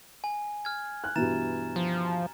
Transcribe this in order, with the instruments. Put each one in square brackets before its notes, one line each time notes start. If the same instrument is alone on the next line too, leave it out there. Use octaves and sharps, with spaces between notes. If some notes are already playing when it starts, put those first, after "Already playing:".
[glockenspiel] G#5
F6 G#6
[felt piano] F#6
[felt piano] G2 B2 E3 [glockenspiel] A#5 A6 E7
[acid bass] F3